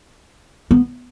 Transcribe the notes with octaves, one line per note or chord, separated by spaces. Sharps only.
B3